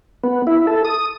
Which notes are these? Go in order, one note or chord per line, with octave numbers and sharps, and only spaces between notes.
B3
E4
A4
D#6